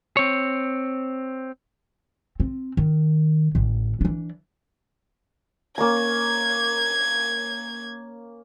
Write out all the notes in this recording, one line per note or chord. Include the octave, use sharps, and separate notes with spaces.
C4 C#5
C4
D#3
A1 D3
E3 D4
A#3 C#4 A#5 G#6